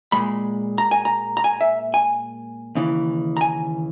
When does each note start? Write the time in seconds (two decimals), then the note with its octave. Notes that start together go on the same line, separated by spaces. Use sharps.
0.12 A#2 G#3 B5
0.78 A#5
0.91 G#5
1.05 A#5
1.37 A#5
1.44 G#5
1.61 E5
1.94 G#5
2.75 D#2 C#3 E3
3.37 A#5
3.41 G#5